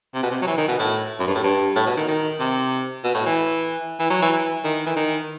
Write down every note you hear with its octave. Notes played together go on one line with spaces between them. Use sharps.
C3
B2
C3
F#3
E3
D#3
B2
A2
F#2
G2
A2
G2
A2
B2
D#3
D#3
C3
B2
A2
E3
E3
F#3
E3
E3
D#3
E3
D#3